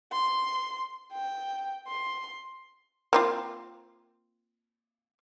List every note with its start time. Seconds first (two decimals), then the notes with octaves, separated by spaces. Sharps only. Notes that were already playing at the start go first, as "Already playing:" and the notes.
0.13 C6
1.13 G5
1.88 C6
3.13 A#3 C4 F4